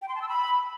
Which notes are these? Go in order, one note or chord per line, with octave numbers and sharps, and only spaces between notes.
G5
C6
A5
E6
B5